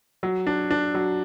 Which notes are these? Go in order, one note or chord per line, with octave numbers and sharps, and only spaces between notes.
F#3
D4
D4
F#3